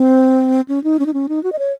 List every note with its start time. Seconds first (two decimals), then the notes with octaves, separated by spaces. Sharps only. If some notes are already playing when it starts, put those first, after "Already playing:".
Already playing: C4
0.68 C#4
0.84 D#4
0.99 C#4
1.06 D#4
1.14 C#4
1.29 D#4
1.43 F#4
1.52 D#5
1.59 C#5